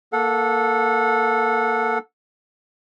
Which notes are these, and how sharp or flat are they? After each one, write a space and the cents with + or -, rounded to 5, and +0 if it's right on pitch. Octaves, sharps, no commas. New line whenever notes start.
A#3 +0 A4 +0 F#5 -30